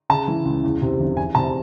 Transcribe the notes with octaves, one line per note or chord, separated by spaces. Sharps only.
C#3 A5
E3
C#2
E2
C3
F1
E2 G#5
C3 A5